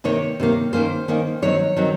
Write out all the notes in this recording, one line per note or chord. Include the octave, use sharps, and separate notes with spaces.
C3 D#3 A#3 C#5
C3 D#3 A#3
D#3 A#3 C#4 C5
D#3 A#3 C#4
D#3 F#3 C4 C#5
D#3 F#3 C4